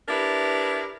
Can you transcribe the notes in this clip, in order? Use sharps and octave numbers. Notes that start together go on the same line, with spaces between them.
D4 E4 G4 A#4 B4